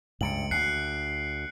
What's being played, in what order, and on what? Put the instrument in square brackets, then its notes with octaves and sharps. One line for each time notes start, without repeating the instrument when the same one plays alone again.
[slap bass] C#2 G2 [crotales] C#7 D7 F#7
[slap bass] D2 [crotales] F#6 C7 C#7